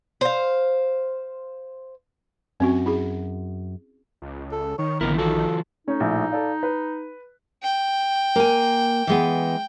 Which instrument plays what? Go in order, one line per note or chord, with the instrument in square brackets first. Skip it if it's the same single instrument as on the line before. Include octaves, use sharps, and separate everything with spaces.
[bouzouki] C5 F5
[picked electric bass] F#2 [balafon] C4 C#4 F#4
[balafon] E4 G#4
[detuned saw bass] C#2
[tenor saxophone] A4
[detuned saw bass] D#3 [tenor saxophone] C#5
[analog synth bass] A#1 [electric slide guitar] D3 B3 E4 [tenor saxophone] A#4
[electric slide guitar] E3 F4 F#4 [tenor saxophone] A4
[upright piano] A3 C#4 C#5 [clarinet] D#4
[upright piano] A#1 A2
A4 D5 F5
B4
[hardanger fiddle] G5
[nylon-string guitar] A#3 G#5
E3 G#3 B3